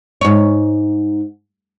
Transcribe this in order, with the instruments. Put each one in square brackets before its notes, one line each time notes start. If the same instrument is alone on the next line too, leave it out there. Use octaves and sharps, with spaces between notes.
[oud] G#2 C#5